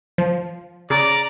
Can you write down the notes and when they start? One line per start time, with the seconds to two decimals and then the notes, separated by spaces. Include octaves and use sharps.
0.18 F3
0.90 C#3 D5 A#5